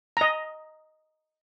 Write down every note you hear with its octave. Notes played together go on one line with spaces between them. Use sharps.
D#5 A#5